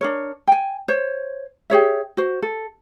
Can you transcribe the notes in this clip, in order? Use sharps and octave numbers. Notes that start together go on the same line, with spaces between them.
D4 A#4 C#5
G5 G#5
C5 C#5
G4 G#4 C#5 E5
F#4 C5
A4